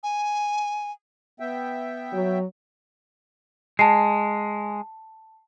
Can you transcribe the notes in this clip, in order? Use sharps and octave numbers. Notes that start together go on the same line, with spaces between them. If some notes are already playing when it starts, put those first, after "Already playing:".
G#5
B3 E5 G5
F#3
G#3 A5 C7